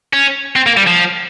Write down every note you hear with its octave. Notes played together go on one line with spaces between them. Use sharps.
C#4
C4
A#3
G3
F3